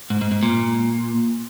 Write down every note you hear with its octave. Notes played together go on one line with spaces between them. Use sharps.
G#2
G#2
G#2
A#2